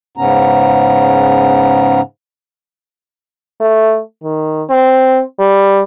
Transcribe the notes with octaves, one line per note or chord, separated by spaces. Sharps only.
G#2 C#3 B3 C#4 A#5
A3
D#3
C4
G3